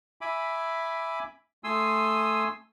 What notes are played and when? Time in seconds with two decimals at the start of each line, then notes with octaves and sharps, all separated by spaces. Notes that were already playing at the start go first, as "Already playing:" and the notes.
0.21 E5 G#5 B5 D6
1.64 A3 G#5 C6 D#6 E6